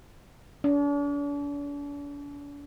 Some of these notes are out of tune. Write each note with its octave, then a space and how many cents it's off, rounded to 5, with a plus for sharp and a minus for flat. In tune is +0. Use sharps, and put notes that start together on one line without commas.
D4 -40